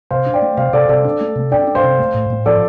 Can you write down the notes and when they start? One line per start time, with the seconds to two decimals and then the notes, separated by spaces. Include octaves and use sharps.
0.11 C3 C5 F5
0.26 D4
0.34 D5 G5
0.42 A3
0.57 C3 C5 F5
0.73 C3 A4 D5
0.89 C3 A4 D5
1.05 D4
1.21 A3
1.36 C3
1.51 D4 D5 G5
1.67 D4
1.75 C5 F5
1.83 C3
1.99 A3
2.14 A2
2.30 A2
2.46 F3 A4 D5